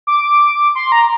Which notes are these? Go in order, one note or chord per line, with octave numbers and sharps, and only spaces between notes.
D6
C6
A#5